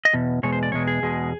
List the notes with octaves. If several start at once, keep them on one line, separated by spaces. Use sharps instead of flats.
D#5
E2 B2
E2 B2 G#3 C#5
C5
D5
E2 B2 G#3 C#5
G#4
E2 B2 G#3